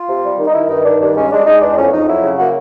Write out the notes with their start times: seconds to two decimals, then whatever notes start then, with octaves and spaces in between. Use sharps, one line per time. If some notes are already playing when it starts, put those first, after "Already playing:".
Already playing: F4
0.08 C3
0.24 G3
0.38 D#3
0.47 D#4
0.54 D#3 E4
0.69 G2 D#4
0.85 D#3 D4
1.00 G2 D4
1.15 G#3 C#4
1.31 G#3 D4
1.46 G#3 D#4
1.61 E2 D4
1.76 F2 C#4
1.92 F2 D#4
2.08 F#3 E4
2.22 C#3
2.38 A#3 F#4